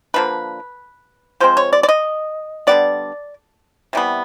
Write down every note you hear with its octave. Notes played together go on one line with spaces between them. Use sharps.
D3 F3 A#3 B4
F3 G#3 C4 C5
C#5
D5
D5
D#5
D3 G3 B3 D5
C3 E3 G3 B3